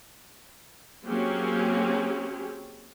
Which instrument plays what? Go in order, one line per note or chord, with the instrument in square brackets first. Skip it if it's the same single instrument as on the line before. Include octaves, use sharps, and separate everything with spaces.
[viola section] F#3 A#3 C4 C#4 G4 G#4